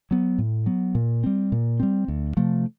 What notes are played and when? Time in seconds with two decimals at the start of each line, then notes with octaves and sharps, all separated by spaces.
0.11 F#3 B3
0.38 A2
0.66 F#3 B3
0.95 A#2
1.24 G3 C4
1.52 A#2
1.80 G3 C4
2.08 D2
2.37 C3 F3 A3